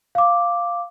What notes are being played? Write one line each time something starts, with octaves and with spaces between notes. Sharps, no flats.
F5 D6